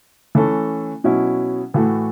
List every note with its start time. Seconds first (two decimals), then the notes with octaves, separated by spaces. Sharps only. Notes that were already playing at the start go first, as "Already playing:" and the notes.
0.35 E3 A3 C#4 A4
1.04 B2 F#3 C#4 E4
1.74 A2 E3 A3 F#4 A4